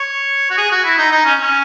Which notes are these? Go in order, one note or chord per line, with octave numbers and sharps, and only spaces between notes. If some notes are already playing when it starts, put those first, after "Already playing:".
Already playing: C#5
F#4
G#4
F#4
E4
D#4
D#4
C#4
C#4